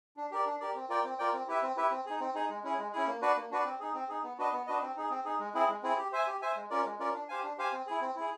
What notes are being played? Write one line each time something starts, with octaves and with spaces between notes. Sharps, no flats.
D4
G4 A#4 D5
D4
G4 A#4 D5
C4
F4 A#4 D5 G5
C4
F4 A#4 D5 G5
C4
E4 G4 B4 E5
C4
E4 G4 B4 E5
C4
D#4 G#4
C4
D#4 G#4
G#3
C#4 E4 G#4
G#3
C#4 E4 G#4
A#3
D4 F#4 B4 D5
A#3
D4 F#4 B4 D5
C4
D#4 G#4
C4
D#4 G#4
B3
D4 F#4 B4 D#5
B3
D4 F#4 B4 D#5
C4
D#4 G#4
C4
D#4 G#4
G#3
C4 E4 G#4
G#3
C4 E4 G#4
G4
C5 E5 G#5
G4
C5 E5 G#5
G#3
C#4 F4 A#4 D5
G#3
C#4 F4 A#4 D5
D4
G4 C5 F5 G#5
D4
G4 C5 F5 G#5
C4
E4 G#4
C4
E4 G#4